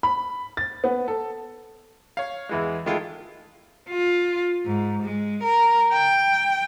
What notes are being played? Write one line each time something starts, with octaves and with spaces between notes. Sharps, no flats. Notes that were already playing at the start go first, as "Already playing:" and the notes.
B5
A6
B3
A4
C#5 F5
E2 E3 G#3
D#3 G#3 A3 E4 F4 A4
F4
G#2
G#3
A#4
G5